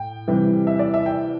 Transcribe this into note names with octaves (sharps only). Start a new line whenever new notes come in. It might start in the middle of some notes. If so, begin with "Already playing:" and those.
Already playing: A2 G5
C3 E3 G3
E5
D5
E5
G5